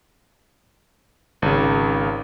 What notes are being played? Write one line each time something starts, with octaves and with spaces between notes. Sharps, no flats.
G#1 C#3